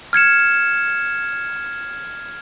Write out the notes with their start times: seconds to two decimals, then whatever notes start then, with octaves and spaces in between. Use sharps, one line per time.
0.13 F6 G#6 C#7 E7